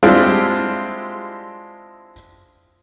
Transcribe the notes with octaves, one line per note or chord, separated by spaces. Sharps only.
G#3 C4 D4 E4 F4 G4